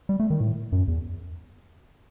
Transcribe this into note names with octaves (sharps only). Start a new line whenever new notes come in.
G3
A3
D#3
A2
F#2
E2